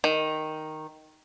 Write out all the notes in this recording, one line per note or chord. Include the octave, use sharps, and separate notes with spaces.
D#3